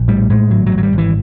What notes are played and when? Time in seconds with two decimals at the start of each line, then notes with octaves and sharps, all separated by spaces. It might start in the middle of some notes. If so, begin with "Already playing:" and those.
Already playing: A#1
0.08 A2 G3
0.30 A2 G#3
0.50 G#1 F#3
0.66 F#3
0.72 G#1
0.78 F#3
0.83 G3
0.93 G#1
0.98 E3